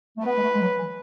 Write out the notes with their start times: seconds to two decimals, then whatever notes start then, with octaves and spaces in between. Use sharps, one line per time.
0.17 A3
0.24 B3 B4
0.37 G#3
0.42 A3
0.54 G#3
0.60 F#3
0.78 E3